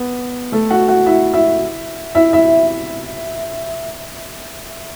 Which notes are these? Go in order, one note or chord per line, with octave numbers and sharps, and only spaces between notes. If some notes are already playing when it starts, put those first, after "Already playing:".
Already playing: B3
A3 A4
F#4 F#5
F#4 F#5
E4 E5
E4 E5
E4 E5
E4 E5